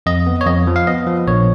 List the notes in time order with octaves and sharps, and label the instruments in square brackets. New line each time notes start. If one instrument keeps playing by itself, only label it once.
[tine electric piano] F2 D#5
B3
C#5
F2 D#5
F3
F5
B3 D#5
F3
A#1 C#5